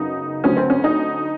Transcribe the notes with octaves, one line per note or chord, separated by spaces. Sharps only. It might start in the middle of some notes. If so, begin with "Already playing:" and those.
Already playing: F#2 C#3 F#3 B3 D#4
D2 D3 F#3 A3 C4 C#4
C4
C#4
D#4